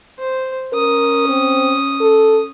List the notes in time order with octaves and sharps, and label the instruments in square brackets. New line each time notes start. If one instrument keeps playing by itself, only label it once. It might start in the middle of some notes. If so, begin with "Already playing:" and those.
[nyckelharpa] C5
[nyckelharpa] C#4 D#6 [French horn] A#4
[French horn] C4
A4